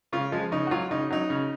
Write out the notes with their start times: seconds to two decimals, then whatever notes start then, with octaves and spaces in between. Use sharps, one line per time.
0.13 C#3 F4
0.32 F3 G#3
0.52 C#3 D#4
0.67 F#4
0.71 F#3 F4
0.91 C#3 D#4
1.10 F#3 D#4
1.30 C#3